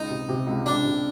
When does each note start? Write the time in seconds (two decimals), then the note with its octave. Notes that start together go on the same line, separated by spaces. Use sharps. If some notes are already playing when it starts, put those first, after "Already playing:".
Already playing: C#2 D#4
0.10 C3
0.29 C3
0.46 C#2
0.66 C#2 D4
0.85 C3